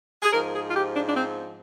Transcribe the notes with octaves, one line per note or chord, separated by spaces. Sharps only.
G#4
G#2 F3 A#4
G#4
F4
G4
D4
D4
C4